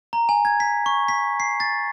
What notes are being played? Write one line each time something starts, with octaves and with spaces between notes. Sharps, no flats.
A#5
G#5
G#6
B6
C#6
B6
C7
A6